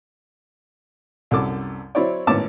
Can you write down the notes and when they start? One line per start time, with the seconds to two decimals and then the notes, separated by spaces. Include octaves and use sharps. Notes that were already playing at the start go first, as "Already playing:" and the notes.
1.31 C2 F#2 A4 D6
1.95 F#3 C4 E4 C#5 D5
2.27 G#1 A2 B3 C#4 A5 D6